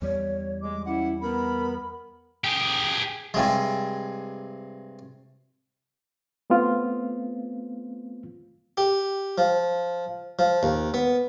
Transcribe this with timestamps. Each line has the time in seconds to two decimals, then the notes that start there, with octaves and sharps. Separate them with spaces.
0.02 E2 G3 C#5
0.62 G#3 D6
0.86 C#4 E4 F#5
1.21 B3 A#4 B5
2.44 G4 G#4
3.34 G2 C3 G#3
6.50 A3 B3 C4 F4
8.77 G4
9.38 F3
10.39 F3
10.63 D#2
10.94 B3